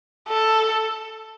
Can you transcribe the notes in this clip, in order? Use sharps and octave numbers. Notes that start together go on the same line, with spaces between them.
A4